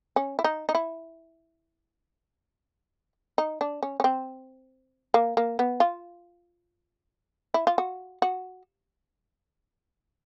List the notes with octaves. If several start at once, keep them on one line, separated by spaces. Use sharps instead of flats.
C#4
E4
D#4
D#4
E4
D#4
D4
C#4
C#4
C4
A#3
A#3
B3
F4
E4
F4
F#4
F#4